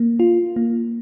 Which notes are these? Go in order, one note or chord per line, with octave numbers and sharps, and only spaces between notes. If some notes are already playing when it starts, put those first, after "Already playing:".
Already playing: A#3
F4
A#3